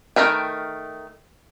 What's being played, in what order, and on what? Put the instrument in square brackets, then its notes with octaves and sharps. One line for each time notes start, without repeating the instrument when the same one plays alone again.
[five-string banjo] D#3 A3 A#4 B4 G5